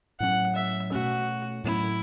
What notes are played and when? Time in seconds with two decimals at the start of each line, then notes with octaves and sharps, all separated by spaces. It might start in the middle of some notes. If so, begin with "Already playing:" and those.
0.20 A2 F#3 C#4 F#5
0.55 E5
0.92 B2 A3 C#4 F#4
1.64 A2 F#3 A3 C#4 E4